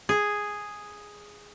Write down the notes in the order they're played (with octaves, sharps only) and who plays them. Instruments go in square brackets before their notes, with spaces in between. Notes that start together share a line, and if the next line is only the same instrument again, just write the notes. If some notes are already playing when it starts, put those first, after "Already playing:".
[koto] G#4